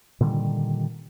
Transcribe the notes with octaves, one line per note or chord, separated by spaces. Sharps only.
A#2 D3 D#3 G3